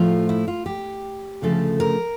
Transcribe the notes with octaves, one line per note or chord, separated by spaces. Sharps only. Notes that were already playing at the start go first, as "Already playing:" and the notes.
Already playing: A2 F3 A3 F4
E4
F4
G4
D2 C#3 F3 A3 A4
A#4